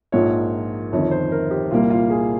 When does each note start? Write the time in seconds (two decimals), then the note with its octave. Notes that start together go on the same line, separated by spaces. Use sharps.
0.12 A#1 G#2 F3 A#3 C#5
0.92 G1 F2 D#3 C#5
1.11 C5
1.32 A#4
1.51 G4
1.71 C2 A#2 G3 A#3 F4
1.90 F4
2.10 G#4